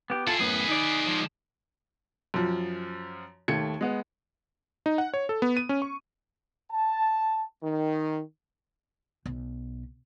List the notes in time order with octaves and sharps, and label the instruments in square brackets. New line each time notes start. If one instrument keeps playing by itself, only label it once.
[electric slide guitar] B3 G4
[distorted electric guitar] E4 G#4 [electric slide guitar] F4 A4
[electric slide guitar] F#2 A2 B3 [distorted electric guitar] G#4 B4
[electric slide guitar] D#4 D5
[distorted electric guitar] F3 G#3
[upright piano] F#2 F3
D#2 A3 G#6 C#7
G#3 B3
[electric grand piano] D#4
F#5
C#5
A4
B3
D#7
C#4
C#6
[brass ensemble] A5
D#3
[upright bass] B1